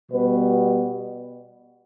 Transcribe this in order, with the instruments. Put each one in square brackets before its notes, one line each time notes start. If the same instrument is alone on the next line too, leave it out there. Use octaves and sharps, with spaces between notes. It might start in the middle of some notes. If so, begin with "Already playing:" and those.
[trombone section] B2 G3 B3 B4